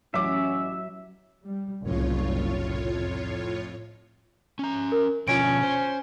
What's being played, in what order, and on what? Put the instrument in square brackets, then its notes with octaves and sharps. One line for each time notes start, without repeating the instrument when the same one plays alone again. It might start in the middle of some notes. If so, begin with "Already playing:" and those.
[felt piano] A1 D6 [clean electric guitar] F#3 [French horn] C#4 [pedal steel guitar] E5
[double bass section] G3
[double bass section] F#1 C2 [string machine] A2 F4 C#5
[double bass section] F2
[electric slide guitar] C#4 A#5
[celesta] A#4
[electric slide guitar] B2 D3 F3 [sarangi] C#4 [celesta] F4 D7
[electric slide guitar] C5